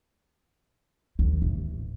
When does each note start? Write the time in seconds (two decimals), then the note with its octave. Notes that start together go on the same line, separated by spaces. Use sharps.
1.19 D#2
1.42 A1